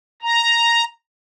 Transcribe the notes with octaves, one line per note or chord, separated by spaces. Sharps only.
A#5